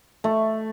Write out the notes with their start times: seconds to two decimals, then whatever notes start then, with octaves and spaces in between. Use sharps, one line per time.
0.24 A3